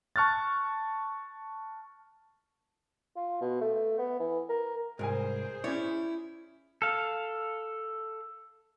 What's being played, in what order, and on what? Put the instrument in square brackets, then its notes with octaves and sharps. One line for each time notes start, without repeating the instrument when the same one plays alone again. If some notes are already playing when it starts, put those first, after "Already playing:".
[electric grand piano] A5 C#6 F6 F#6 A6
[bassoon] F4
B2
A3
B3
E3
A#4
[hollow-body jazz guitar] C2 G#2 [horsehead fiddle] G#4 C5 [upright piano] A#4 G#5
[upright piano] C#4 D5 [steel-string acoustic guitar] E4 [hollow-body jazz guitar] C#5
[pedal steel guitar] A4 F5